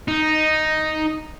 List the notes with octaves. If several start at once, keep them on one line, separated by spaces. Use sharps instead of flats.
D#4